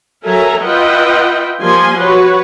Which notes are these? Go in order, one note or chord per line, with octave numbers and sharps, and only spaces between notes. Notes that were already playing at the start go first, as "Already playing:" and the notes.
F#3 A4 A#4 E5 G#5 A#5
F4 B4 D#5 E5 F#5 G5
F3 G3 A#3 G#5 C6
F#4 B4 C#5